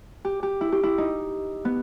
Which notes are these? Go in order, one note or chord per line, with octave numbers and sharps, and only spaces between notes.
G4
G4
E4
G4
E4
D#4
B3